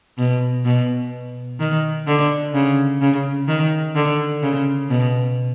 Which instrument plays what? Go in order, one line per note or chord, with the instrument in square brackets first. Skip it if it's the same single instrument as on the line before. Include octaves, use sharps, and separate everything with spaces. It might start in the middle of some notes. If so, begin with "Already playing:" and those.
[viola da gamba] B2
B2
D#3
D3
C#3
C#3
D#3
D3
C#3
B2